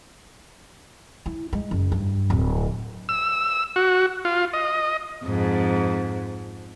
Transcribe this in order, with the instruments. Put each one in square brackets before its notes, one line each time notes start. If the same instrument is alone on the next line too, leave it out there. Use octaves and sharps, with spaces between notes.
[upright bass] E4
G#3
F#1
G2
D1
[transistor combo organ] E6
F#4
F4
D#5
[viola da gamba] F2 G#2